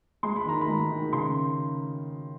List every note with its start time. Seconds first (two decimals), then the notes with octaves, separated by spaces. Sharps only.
0.23 G#3 C6
0.36 B5
0.45 D#3 A#5
0.61 B5
0.68 G#3
0.91 D#3
1.13 C#3 C6